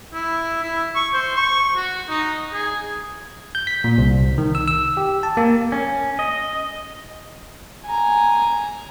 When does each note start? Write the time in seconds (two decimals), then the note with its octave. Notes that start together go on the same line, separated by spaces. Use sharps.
0.14 E4
0.63 E4
0.96 C#6
1.14 C5
1.36 C#6
1.76 F#4
2.09 D#4
2.53 G#4
3.55 G6
3.67 B6
3.84 A#2
3.98 C2
4.38 D#3
4.55 E6
4.68 E6
4.97 G4
5.23 A5
5.37 A#3
5.72 C#4
6.19 D#5
7.86 G#5 A#5